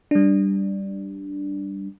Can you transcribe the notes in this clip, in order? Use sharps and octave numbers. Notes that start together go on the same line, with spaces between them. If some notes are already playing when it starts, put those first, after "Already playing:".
G3 D4